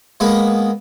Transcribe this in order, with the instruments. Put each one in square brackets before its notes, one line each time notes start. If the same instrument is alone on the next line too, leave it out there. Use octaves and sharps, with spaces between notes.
[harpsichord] G#3 A#3 B3 G#4